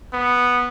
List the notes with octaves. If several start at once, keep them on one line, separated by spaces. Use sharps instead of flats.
B3